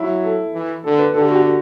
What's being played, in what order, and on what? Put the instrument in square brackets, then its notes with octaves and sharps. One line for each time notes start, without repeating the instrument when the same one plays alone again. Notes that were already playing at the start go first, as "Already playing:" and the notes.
Already playing: [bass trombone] F#3 [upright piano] E4
[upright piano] A4
[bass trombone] E3
[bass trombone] D3 [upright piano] A4
[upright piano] B4
[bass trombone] D3 [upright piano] A4
[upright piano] G4
F#4
G4